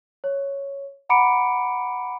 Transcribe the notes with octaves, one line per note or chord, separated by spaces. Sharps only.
C#5
F#5 A#5 B5 D6 C#7 D7